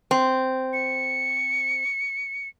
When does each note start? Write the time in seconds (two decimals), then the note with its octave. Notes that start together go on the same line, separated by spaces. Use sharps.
0.11 C4
0.73 C#7